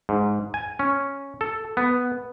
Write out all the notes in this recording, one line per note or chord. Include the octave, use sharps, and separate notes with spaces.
G#2
G#5
C#4
A4
B3